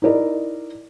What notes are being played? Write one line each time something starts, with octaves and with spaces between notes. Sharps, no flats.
D#4 E4 A#4 D5 D#5